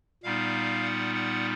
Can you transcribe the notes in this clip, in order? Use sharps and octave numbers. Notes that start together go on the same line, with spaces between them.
A#2 G3 B3 D#4 F5
F#5
F#5